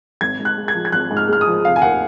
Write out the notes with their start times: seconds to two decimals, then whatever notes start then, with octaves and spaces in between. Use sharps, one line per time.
0.21 G#1 G#6
0.40 G#2
0.45 F#6
0.57 G#3
0.68 G#6
0.75 F3
0.85 G#6
0.92 G#1 F#6
1.11 G#2
1.17 F6
1.28 G#3 F6
1.41 D#6
1.47 F3
1.65 F1 F5
1.76 G#5
1.82 D#2 F#5